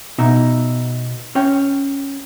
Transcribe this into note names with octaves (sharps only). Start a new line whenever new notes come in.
B2 D#4 E5
C#4 C#5 G5